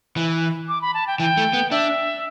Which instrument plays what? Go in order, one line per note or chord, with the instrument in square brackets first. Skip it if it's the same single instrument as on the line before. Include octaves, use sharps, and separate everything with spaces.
[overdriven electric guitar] E3
[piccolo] D6
B5
A5
G5
[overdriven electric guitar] E3 [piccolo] G5
[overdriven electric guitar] A3
B3
[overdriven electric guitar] D4 [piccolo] E5